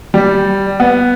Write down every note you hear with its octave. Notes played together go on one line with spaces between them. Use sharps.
G3
B3